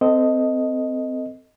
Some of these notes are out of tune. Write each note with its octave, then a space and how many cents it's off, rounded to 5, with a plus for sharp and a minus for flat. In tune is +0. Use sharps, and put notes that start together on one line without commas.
C4 -15 A4 +15 D#5 +0